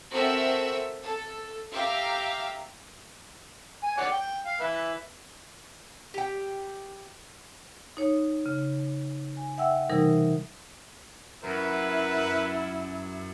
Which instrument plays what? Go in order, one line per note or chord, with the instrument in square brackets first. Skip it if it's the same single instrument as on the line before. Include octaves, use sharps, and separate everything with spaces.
[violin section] C4 F#4 A4 A#4 E5
A4
G4 E5 F5 A#5
[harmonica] G#5
C#5 D5 F#5
G5
F5
B4 E5
[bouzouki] G4 G5
[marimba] D#4 C#5
C#3
G#5
E5 F#5 G5 E6
C3 E3 G3 D#4 A#4
[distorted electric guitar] F#2 [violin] E4 [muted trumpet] A#4 [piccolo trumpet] B4